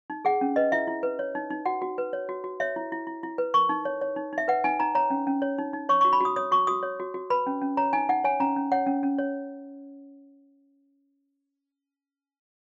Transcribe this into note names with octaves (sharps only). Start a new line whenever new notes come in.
D#4
G#4 F#5
C#4
B4 D#5
E4 E5
E4
B4
C#5
D#4
D#4
F#4 F#5
F#4
B4
C#5
F#4
F#4
C#5 E5
E4
E4
E4
E4
B4
A#4 C#6
D#4
C#5
C#5
D#4
D#4 E5
B4 F#5
D#4 G#5
D#4 A#5
C#5 A#5
C#4
C#4
C#5
D#4
D#4
C#5 C#6
C#6
F#4
B5
F#4 D#6
C#5 D#6
F#4 C#6
F#4 D#6
C#5
F#4
F#4
B4 B5
C#4
C#4
C#5 A#5
D#4 G#5
D#4 F#5
C#5 G#5
C#4 A#5
C#4
C#5 F#5
C#4
C#4
C#5